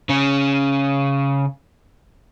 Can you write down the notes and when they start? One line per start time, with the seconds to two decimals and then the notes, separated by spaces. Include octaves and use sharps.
0.09 C#3 C#4